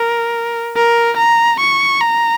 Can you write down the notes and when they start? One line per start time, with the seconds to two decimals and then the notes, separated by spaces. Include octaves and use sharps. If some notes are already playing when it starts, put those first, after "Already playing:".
Already playing: A#4
0.76 A#4
1.17 A#5
1.60 C#6
2.00 A#5